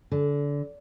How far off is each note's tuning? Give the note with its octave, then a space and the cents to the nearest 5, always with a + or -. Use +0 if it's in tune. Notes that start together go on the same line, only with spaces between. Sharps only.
D3 -25